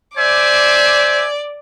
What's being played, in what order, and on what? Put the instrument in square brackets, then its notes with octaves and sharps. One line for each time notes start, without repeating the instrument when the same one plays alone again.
[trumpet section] C5 E5 G#5 [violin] D5 D6